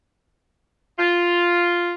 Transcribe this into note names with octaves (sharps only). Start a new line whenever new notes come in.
F4